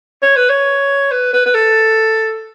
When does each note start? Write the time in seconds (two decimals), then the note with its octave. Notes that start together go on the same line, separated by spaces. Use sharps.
0.22 C#5
0.36 B4
0.49 C#5
1.12 B4
1.33 B4
1.46 B4
1.55 A4